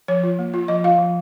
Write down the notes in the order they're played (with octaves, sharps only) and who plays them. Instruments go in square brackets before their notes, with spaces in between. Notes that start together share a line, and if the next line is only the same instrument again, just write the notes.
[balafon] F3 C#5
F4
A#3
F4
F3 D#5
F4 F5
F3